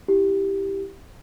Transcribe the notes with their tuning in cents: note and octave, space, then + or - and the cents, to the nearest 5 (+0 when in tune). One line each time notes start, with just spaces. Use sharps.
E4 -15 G4 +0